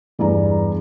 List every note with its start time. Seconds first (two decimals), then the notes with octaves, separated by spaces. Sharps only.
0.19 E2 G2 G#4 A#5